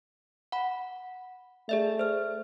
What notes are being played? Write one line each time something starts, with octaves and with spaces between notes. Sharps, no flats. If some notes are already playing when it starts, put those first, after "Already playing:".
F#5 B5
A3 G#4 D5 E5
C5 F6